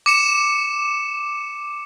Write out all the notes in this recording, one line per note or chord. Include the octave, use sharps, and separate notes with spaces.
D6 C#7 E7